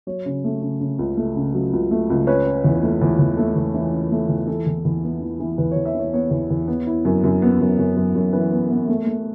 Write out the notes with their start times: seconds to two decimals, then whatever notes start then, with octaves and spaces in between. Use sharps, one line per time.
0.07 F#3 C#5
0.25 C#3
0.44 A3
0.62 C#3
0.80 C#3
0.99 C#2
1.17 A3
1.36 C#3
1.54 F#3
1.73 C#2
1.91 A3
2.10 C#2
2.27 C#4 B4
2.46 C#4
2.64 E2
2.83 A3
3.02 E2
3.19 E2
3.37 A3 A4
3.56 E2
3.74 E3
3.92 C#4
4.12 A3
4.29 E2
4.47 E3 A4
4.66 E2
4.85 E2
5.04 B3
5.21 E3
5.40 E3
5.58 E2 B4
5.71 E2 C#5
5.85 E5
5.95 E3 C#5
6.13 B3 C#5
6.31 E2
6.50 E2
6.68 B3
6.87 E4
7.05 F#2
7.24 F#2
7.42 B3
7.60 F#2
7.79 F#2
7.96 F#2
8.15 F#2
8.33 E3 B4
8.52 B3
8.71 B3
8.88 A3
9.06 A3